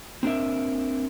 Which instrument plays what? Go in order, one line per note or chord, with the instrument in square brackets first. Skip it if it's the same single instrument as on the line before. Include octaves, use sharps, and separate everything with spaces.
[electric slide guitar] C4 D4 A#4 E5